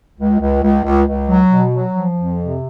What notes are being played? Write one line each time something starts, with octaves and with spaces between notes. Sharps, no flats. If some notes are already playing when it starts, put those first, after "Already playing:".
C#2
C#2
C#2
C#2
C#2
F#3
B2
F#3
F3
F2
C3